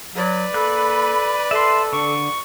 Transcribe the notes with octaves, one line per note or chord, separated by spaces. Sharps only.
F#3 B4 D5
A#3 A4 B5 F#6
A4 E5 C6
D3 C#6